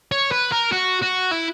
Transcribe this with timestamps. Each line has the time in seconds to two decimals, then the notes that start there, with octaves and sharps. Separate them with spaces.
0.12 C#5
0.32 B4
0.52 A#4
0.72 F#4
1.02 F#4
1.31 E4